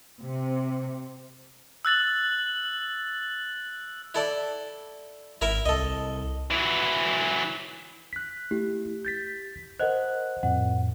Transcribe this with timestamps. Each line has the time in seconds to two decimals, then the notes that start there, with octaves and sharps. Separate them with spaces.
0.22 C3
1.85 E6 F#6 A6 F#7
4.15 E4 A4 D5
5.41 G#1 E4 A#4 E5
5.66 C2 A4 D#5
6.50 E3 F#3
8.13 F#6 B6
8.51 A3 E4 G4
9.05 G6 A6 B6
9.80 A#4 C5 D#5 F#5 F#6
10.43 F2 A2 F#5